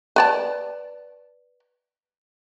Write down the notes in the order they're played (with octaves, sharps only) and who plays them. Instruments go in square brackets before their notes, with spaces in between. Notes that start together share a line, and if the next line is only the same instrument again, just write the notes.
[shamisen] B4 D5 A5